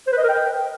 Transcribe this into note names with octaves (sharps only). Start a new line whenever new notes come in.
C5
B4
D#5
A#4
G5